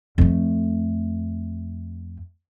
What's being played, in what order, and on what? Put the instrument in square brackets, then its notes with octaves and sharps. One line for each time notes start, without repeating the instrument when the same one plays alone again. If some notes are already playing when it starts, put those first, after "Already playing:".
[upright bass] F2 A3